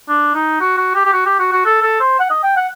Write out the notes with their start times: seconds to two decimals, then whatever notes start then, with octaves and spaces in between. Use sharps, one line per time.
0.09 D4
0.34 D#4
0.61 F#4
0.78 F#4
0.95 G4
1.05 G4
1.13 F#4
1.26 G4
1.40 F#4
1.52 F#4
1.66 A4
1.82 A4
2.00 C5
2.20 F#5
2.31 D#5
2.43 G5
2.56 F#5